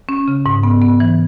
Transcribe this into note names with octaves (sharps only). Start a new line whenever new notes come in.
C#4
C#3
G#2
B3
B3
E3